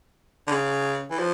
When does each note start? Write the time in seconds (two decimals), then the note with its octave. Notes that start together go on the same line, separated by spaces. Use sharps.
0.47 D3
0.51 C#3
1.10 E3
1.19 F3